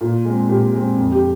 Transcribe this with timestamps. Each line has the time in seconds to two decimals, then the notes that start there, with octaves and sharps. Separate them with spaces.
0.01 A#2 F4
0.25 G#3 C4
0.49 A#2 G4
0.72 G#3 C4
0.96 F2
1.12 G4